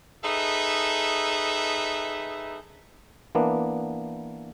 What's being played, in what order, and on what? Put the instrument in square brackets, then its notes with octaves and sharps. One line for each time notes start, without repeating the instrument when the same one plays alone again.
[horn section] D#4 G#4 A4 B4 E5
[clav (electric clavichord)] E3 A#3 B3 D4